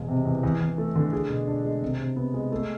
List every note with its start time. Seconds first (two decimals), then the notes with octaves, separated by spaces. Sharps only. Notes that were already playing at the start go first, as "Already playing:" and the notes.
Already playing: E1 G#3
0.08 C3
0.25 E2
0.43 E2
0.60 E2
0.78 A3
0.95 D3
1.13 G#4
1.30 B2
1.48 D4
1.64 G#3
1.82 C3
1.99 C3
2.16 B3
2.34 G#3
2.52 A3